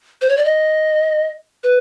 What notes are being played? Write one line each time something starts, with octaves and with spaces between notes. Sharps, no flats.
C5
C#5
D5
D#5
B4